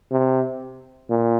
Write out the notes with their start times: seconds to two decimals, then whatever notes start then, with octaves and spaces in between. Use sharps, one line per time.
0.11 C3
1.10 A#2